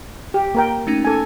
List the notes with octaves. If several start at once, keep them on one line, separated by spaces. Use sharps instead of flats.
G4
A#3 A#4 G5
A3 C#4 D#4
A4 G#5